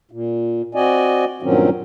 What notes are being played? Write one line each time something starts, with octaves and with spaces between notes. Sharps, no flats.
A#2
C4 F#4 D5 D#5 G#5
G2 A#2 D#3 F#3 C4 C#4